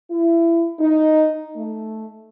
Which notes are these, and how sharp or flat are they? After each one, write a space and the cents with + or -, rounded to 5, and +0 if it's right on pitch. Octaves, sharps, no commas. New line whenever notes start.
E4 +25
D#4 +0
A3 -5